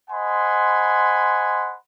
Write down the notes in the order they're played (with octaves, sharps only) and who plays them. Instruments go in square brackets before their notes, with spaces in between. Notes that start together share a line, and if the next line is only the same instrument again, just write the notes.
[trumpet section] C5 D#5 F#5 G#5 B5 C6